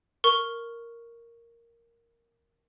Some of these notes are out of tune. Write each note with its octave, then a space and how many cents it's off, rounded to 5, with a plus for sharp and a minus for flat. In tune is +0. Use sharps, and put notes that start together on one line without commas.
A#4 +0 C#6 +0